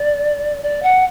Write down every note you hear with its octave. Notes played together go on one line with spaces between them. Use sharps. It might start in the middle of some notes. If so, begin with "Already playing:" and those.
Already playing: D5
D5
F#5